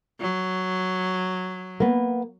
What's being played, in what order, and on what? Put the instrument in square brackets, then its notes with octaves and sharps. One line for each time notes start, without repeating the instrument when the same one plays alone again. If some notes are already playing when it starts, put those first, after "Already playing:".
[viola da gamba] F#3
[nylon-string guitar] A#3 B3